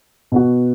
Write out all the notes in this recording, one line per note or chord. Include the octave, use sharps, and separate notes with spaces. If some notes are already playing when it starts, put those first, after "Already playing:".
B2 B3 F#4